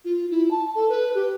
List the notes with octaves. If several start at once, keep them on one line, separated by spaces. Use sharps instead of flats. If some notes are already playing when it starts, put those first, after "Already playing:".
F4
E4
A5
A4
B4
G4